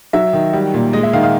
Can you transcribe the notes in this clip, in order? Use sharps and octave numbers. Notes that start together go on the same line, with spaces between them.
F#3 E5
D#3
G3
A#2
G#3 D#5
E5
D#3 F5
F5